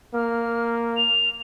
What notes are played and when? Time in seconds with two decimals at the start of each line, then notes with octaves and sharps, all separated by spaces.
0.14 A#3 F6
0.96 F7